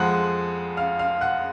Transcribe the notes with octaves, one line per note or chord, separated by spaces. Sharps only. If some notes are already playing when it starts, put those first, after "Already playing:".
Already playing: F2 F3 G#3 F#5 F#6
F5 F6
F5 F6
F#5 F#6